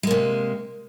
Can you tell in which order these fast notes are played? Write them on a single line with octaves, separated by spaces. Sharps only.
G#3 A#3 C3